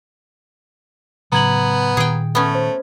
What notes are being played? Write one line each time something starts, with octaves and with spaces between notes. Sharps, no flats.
A2 C#3 F#3 B3 A#5 G#6 F#7
A#2 D#3 G#4 G5
A3 B3 C#4
C5